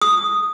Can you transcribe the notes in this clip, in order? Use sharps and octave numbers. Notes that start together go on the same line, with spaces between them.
D#6